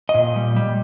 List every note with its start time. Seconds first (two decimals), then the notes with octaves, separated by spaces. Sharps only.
0.09 D#5
0.14 A#2
0.36 G3
0.56 G3